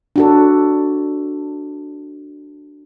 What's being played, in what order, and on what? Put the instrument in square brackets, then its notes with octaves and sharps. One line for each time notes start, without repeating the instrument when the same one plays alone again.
[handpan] D4 F#4 A4